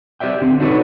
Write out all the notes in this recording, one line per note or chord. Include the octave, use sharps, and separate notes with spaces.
G4 C5 D5 E5 G5
D3 C4
D4 D#4 F#4 A4 B4 C#5